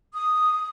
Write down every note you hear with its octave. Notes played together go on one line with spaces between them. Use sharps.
D#6